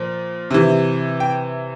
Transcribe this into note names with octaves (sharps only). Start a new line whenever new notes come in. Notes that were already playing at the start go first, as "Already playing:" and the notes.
Already playing: A#2 F3
C3 E3
G5